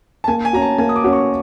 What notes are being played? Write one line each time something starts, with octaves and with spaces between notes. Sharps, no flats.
A5
A#3 G#5
G#5
C#4 F#4 A#5
A5
A#3 G#5
D#6
D6
C#4 F#4
C#6